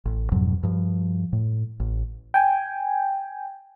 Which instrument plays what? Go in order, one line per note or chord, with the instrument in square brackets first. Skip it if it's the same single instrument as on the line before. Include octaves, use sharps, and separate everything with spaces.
[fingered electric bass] A1
F2 G#2 B2 F#3
G2 F3
A2
A1
[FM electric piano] G5 G#5